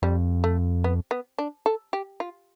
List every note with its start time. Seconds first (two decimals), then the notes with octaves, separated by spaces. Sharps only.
0.02 F2 G3
0.44 A3
0.84 B3
1.11 B3
1.38 D4
1.66 A4
1.93 G4
2.20 F4